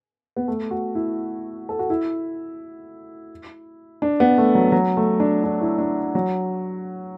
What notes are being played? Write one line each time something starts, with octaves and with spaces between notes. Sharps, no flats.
B3
A3
F#4
E4
A4
F#4
E4
D4
B3
A3
F#3
F#3
A3
D4
D4
E4
D4
F#3